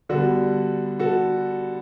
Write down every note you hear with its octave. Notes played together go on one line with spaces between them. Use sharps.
D3 G3 B3 F#4 A4
F#4 A4